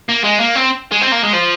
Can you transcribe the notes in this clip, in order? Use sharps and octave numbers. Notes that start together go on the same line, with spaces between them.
A#3
G#3
A#3
C4
G#3
C4
A#3
G#3
F3